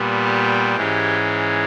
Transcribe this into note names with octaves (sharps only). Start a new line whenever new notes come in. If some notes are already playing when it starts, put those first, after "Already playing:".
Already playing: A#2 G3 B3
G4
G#2 E3 G#3 C#4